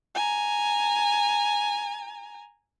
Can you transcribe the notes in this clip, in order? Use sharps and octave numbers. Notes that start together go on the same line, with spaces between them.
G#5 A#5